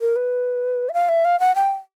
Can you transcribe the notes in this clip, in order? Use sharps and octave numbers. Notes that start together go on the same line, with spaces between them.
A#4
B4
E5
F5
E5
F5
F#5
G5